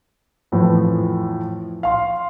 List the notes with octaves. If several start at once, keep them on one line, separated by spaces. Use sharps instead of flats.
F2 A2 E3 F3
F5 C6